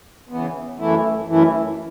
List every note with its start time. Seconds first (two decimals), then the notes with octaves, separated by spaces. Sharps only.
0.29 C#3 E3 B3
0.78 F#2 E3 A3 E4
1.26 F#2 E3 A3 E4